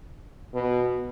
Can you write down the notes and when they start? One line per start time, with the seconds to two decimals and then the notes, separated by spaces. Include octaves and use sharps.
0.54 B2